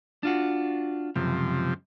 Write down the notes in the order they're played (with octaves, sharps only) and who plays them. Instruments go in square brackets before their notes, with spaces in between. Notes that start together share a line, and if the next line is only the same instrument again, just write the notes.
[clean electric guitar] D4 F4 F#4
[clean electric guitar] C#2 F#2 [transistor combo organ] C3 F3